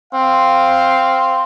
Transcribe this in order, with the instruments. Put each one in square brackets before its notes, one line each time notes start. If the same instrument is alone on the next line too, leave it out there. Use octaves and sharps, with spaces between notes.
[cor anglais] C4 [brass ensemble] F5